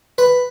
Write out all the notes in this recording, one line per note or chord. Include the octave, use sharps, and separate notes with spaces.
B4